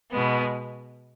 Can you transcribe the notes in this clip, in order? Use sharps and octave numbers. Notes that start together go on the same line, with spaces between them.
B2 G#3 B3